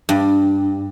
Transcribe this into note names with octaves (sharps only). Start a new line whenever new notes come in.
G2